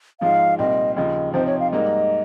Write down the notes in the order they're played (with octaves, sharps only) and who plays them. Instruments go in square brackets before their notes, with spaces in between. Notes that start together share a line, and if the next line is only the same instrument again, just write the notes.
[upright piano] G#2 F3 G#3 D#4 [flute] F5
[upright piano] C2 A#2 G3 C4 D#4 [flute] D#5
[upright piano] D#2 C#3 F3 [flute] D#5
[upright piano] C3 F3 C4 D#4 [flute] C5
[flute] C#5
F5
[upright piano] G#2 G3 A#3 D#4 [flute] D#5